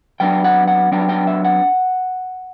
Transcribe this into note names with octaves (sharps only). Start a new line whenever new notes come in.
F#3 B3 D4 G5
F#5
F#5
F#3 B3 D4 G5
G5
E5
F#5